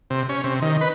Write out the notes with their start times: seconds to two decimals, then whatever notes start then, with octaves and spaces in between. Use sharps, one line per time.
0.10 C3
0.29 C#4
0.44 C3
0.62 D#3
0.81 B4